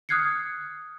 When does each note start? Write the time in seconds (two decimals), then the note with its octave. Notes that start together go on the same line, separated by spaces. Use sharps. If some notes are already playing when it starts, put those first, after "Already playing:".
0.09 D#6 F6 F#6 G#6 C7 C#7